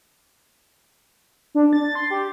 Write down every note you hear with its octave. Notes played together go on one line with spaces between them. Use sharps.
D4
A6
C6
G4